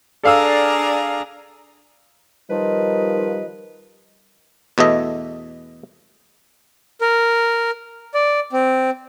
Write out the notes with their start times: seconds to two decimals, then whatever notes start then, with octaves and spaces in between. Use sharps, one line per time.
0.23 D4 G#4 A4 D5 F5 A#5 E6
2.50 D#3 F3 G3 B4 D#5
4.78 E2 B2 A3 D#5 E5
7.01 A#4
8.14 D5
8.53 C4